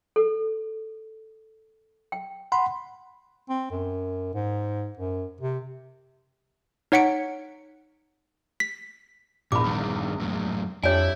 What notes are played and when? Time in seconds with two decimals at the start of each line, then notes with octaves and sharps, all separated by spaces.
0.16 A4
2.12 G5
2.52 F#5 B5 C6
3.49 C4
3.71 F#2
4.34 G#2
4.97 F#2
5.41 C3
6.92 D#4 C#5 F#5 B6 C#7 D7
8.60 B6
9.52 A#1 E2 A#2 B5 D6
9.64 G2 D#3
10.20 F#2 A2
10.84 F2 G3 D4 E4 G4 C#5 G#5